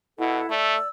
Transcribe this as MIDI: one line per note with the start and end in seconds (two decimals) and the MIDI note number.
0.18 0.40 47
0.18 0.49 64
0.18 0.49 69
0.18 0.49 78
0.49 0.75 57
0.49 0.88 74
0.49 0.88 88